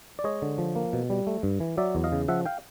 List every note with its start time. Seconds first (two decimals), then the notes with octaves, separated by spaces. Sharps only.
0.19 D5
0.24 G#3 C#5 D#5
0.42 D3
0.58 F3
0.76 A#3
0.93 B2
1.10 G3
1.27 A3
1.43 G2
1.60 E3
1.77 F#3 D5 E5
1.95 E2
2.04 D#5 F5
2.12 C#3
2.28 F3 E5 F#5
2.45 F5 G5